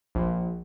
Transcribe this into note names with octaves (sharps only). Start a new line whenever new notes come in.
A#1